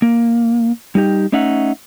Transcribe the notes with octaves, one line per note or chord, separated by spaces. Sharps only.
A#3
G3 D#4 G4
A3 C#4 D#4 E5 F#5